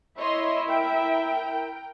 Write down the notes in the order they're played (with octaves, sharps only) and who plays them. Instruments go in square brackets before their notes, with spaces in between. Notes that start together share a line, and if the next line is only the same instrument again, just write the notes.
[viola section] E4 E5 [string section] C#5 D#5 C6
[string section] A#4 G5